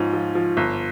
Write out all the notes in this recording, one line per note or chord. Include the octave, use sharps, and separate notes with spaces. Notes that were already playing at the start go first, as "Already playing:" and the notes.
Already playing: G#2 F3 C#4
F3
F3
G1